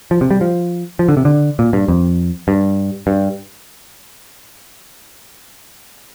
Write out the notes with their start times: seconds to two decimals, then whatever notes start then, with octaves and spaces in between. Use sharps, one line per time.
0.11 F3
0.21 C3
0.31 G3
0.41 F3
0.99 F3
1.09 D3
1.17 C3
1.25 D3
1.59 A#2
1.73 G2
1.88 F2
2.48 G2
3.07 G2